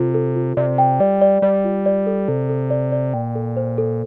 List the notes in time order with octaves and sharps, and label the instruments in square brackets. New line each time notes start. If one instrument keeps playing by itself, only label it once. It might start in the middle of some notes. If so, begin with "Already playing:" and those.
Already playing: [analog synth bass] C3 [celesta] F4 A4
[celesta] A4
F4
[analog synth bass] C3 [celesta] D5
[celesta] G5
[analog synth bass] G3 [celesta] D5
[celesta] D5
[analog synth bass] G3 [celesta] D5
[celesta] F4
D5
A4
[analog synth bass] C3 [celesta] A4
[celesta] A4
D5
D5
[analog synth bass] A#2 [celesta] G5
[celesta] A4
C5
A4